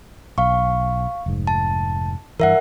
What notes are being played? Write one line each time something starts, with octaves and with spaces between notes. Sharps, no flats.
B1 F5 C#6
F1 G#2
A5
G2 E3 A#4 E5 F#5